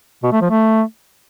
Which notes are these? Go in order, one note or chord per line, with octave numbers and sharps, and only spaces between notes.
B2
A3
F3
A3